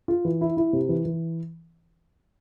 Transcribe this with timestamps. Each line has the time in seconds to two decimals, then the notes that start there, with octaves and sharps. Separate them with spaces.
0.08 F4
0.25 E3
0.41 E4
0.57 E4
0.73 C3
0.89 E3
1.05 E3